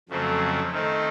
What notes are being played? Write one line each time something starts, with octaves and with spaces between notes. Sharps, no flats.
F2 C#3 F#3 A3 C4
D#3 A3 C4 D#4